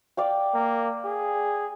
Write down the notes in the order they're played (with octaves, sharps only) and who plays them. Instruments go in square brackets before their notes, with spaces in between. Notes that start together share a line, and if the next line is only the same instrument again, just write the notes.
[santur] D5 F5 G5
[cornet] A#3
G#4